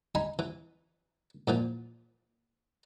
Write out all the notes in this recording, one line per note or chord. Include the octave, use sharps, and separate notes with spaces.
D#4 G#5 B5
E3
A#2 E3 F3